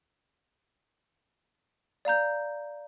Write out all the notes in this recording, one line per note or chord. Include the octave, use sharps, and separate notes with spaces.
D5 F5 A#5 G6